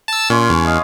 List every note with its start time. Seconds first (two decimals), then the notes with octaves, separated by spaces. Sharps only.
0.08 A5 E6
0.30 A#2 C#4 C6 D6
0.50 E2
0.65 D#5 F5